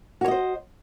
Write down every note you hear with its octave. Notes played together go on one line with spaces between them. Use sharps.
F#4 C5 C#5 D#5